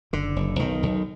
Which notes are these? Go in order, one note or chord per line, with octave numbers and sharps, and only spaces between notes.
F#1 D3
F#1
B1 D#3
B1